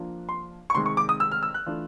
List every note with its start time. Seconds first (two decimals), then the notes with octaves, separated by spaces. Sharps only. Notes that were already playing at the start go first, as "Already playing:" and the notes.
Already playing: F3 A#3 D4 F4
0.29 C6
0.70 C#6
0.74 C3 D#3 G#3 C6
0.86 C#6
0.97 D6
1.09 D#6
1.20 E6
1.32 F6
1.43 E6
1.54 F#6
1.66 E3 A3 D4 F4